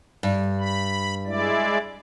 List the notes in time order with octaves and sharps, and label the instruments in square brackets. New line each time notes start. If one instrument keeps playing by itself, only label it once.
[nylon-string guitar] G2
[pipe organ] B5
G#3 E4 D5